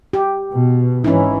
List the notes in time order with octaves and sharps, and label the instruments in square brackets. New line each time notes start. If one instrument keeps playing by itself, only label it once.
[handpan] G4
[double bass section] B2
[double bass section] G#1 E3 [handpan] C#4 D#4 E4